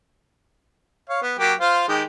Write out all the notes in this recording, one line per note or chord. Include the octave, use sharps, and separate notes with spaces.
C#5 F5
B3
F#3 A#3 G4
F4 C5 F5
D#3 G#3 G4